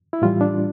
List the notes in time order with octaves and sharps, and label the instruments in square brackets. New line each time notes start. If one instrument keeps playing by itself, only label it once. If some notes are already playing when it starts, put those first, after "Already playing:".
[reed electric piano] E4
A2 E3 G3 F4
D4